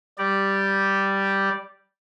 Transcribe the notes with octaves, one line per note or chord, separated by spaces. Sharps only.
G3 G4 D5